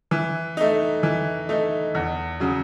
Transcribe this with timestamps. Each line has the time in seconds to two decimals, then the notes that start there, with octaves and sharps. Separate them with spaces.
0.11 E3
0.57 A3 D#4
1.03 E3
1.49 A3 D#4
1.95 E2
2.40 C#3 F#3